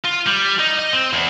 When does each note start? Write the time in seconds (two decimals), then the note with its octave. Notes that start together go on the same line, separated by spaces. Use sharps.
0.05 F4
0.27 G3
0.60 D#4
0.79 D#5
0.93 C4
1.13 E2